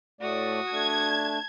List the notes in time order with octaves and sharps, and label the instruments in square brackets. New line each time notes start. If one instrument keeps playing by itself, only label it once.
[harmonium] A2 A3 D5 [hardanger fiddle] F#4 D#6
[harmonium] A3 D4 [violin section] A5 G#6